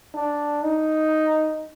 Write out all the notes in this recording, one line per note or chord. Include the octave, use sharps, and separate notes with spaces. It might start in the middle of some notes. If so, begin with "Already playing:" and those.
D4
D#4